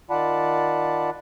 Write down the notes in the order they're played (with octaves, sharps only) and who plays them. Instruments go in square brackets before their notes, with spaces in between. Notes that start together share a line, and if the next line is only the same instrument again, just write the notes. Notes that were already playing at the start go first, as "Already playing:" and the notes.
[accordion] D#3 F4 D5 F#5 A5 B5